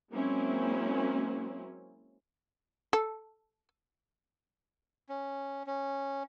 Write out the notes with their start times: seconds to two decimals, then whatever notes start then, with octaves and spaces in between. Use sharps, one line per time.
0.11 F#3 G#3 A#3 C4 C#4 E4
2.93 A4
5.09 C#4
5.67 C#4